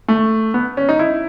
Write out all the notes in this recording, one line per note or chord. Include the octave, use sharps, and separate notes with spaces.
A3
B3
C#4
D#4
E4